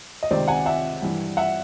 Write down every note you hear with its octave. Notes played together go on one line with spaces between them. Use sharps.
D#5
C#2 C3 D#3 C5 D5
F#5 G#5
E5 F#5
G2 E3
E5 F#5